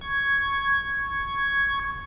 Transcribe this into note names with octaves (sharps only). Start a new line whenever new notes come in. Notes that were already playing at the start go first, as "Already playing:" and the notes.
C#6 G#6